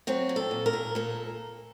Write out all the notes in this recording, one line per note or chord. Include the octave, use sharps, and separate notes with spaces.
F#3 C4
A#2
A4
A#2
A#4
A#2
A#2 A4